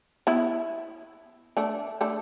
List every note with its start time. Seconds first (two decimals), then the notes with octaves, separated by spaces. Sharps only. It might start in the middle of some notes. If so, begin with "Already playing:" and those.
0.27 B3 E4
1.57 A3 D4
2.01 A3 D4